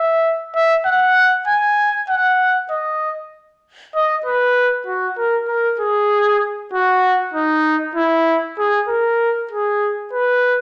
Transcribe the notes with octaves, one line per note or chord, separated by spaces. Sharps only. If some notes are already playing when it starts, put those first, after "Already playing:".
Already playing: E5
E5
F#5
G#5
F#5
D#5
D#5
B4
F#4
A#4
A#4
G#4
F#4
D#4
E4
G#4
A#4
G#4
B4